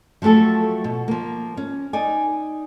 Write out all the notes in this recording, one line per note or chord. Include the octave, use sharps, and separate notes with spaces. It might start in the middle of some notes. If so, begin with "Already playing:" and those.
F3 F#3 A3 G4 A4
B2
F3 A#3
C#4
D#4 D5 G#5